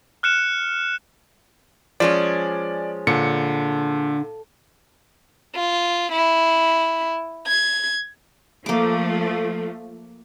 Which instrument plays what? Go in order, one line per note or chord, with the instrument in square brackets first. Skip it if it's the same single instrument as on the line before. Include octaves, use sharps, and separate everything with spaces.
[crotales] F6 F#6 C#7 E7
[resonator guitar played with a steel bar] F3 G#3 C#4 [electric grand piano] D5
[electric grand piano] A#2 C#7 [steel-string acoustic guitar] D3
[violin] F4
E4
G#6
[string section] F3 A3 [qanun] A#3 D6